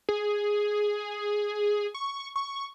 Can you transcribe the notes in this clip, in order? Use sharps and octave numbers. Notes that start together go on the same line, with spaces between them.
G#4
C#6
C#6